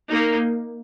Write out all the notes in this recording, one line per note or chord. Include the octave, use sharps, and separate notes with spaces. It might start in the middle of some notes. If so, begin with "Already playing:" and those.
A#3 D#4